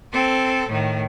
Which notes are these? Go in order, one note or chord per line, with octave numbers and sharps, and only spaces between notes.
C4 A4
A2 D#3